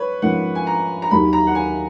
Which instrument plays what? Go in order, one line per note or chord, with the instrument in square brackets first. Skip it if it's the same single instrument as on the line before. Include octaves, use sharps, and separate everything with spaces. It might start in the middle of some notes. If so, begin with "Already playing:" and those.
Already playing: [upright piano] B4 C#5
[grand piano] G#2 F3 A#3 C#4 [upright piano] F#5
[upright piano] G#5
A#5
A#5
[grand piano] D#2 D#3 F#3 [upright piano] B5
[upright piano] A#5
F#5
G#5